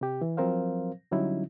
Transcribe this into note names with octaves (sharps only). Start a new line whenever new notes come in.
C3 G4
E3
F3 F#3 C4 A#4 C5 F5
D3 F#3 G3 C#4 D#4 E4